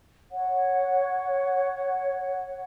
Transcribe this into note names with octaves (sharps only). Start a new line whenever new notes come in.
C#5 F#5